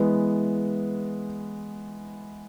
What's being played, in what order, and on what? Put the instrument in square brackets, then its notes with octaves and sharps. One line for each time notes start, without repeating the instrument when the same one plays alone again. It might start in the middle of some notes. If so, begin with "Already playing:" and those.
Already playing: [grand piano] E3 G#3 B3